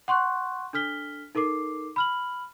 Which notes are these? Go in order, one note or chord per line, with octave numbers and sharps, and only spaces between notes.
F#5 C6 C#6 F#6
D4 A4 F6 B6 G7
D#4 A4 A#4 D6 C7
B5 F6 F#7